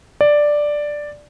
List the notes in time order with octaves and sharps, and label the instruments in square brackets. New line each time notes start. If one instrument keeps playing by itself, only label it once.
[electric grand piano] D5